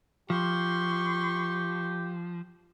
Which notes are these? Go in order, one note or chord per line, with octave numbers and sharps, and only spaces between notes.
F3 G4 C6 C#6